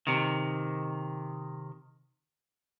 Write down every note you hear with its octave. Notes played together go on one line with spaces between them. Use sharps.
C3 D#3